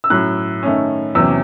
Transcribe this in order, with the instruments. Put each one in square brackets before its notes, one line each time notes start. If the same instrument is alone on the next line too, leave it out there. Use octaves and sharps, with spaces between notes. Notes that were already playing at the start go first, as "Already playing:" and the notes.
[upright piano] E6
A2 F#3 C#4 F#6
D#3 A3 C#4
E2 C3 F#3 C#4 E6